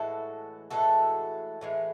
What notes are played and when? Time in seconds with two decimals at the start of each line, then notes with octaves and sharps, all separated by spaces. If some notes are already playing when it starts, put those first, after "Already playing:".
Already playing: A2 E3 G#3 F#4 A4
0.70 A2 E3 G#3 F#4 A4
1.61 A2 E3 G#3